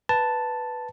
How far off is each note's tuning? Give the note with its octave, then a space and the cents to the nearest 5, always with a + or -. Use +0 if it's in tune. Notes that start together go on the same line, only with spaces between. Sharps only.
B4 +0 A5 +0